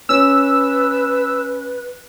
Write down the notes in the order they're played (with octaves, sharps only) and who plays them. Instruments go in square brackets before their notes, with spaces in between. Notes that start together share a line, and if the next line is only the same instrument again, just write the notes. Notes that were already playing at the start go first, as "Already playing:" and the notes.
[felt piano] C#4 [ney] B4 [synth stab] E6